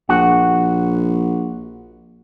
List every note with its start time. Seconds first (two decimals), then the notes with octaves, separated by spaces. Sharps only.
0.09 A#1 F#4